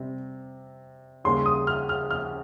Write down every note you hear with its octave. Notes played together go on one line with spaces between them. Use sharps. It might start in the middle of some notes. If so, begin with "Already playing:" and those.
Already playing: C3 G3 C4
D#2 C#3 G3 A#3 C6
D#6
F6
F6
F6